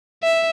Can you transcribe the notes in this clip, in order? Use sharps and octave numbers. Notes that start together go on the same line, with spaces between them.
E5